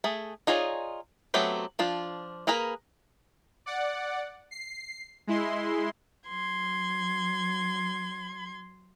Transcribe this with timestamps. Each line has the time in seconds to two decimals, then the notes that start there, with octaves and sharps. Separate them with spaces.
0.04 A3 G#4
0.47 D#4 F4 G#4 C#5 D5
1.34 F#3 A3 B3 C4 G4
1.79 F3 D4 F4
2.47 A#3 G#4 A#4 B4
3.66 D5 F#5
4.51 C7
5.27 G#3 E4 C6
6.28 F#3 C6 G#6